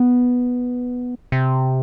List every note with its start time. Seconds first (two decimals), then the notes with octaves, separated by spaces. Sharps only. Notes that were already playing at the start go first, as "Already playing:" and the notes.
Already playing: B3
1.32 C3